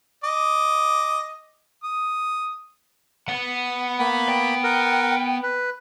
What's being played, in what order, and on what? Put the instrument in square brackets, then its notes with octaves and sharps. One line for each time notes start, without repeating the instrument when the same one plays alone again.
[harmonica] D#5 D6
D#6
[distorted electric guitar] B3 [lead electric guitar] F#5
[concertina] A#3 B5
[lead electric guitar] G5
[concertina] A#4 F#5
B4